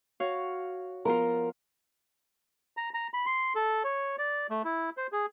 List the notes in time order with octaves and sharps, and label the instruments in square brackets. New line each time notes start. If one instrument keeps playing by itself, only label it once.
[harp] F#4 C#5 F5
[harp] F3 B3 F4 [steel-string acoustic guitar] A#4
[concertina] A#5
A#5
B5
C6
A4
C#5
D5
A3
E4
C5
G#4